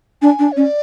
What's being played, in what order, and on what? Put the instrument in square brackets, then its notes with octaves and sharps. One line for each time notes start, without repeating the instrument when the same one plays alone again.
[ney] D4 [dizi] G#5
[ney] D4
[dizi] C#5
[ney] C#4 [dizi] D5